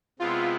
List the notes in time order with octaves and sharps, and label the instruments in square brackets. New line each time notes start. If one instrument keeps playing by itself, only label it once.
[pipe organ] C3 G#3 B3 E4 [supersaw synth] F4